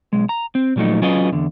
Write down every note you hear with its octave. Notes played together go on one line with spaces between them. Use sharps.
B1 G#3
A#5
C4
A#2 F3 F#3 A3 D#4
F#3 C#4 F4 G#4 B4 D#5
E2 D3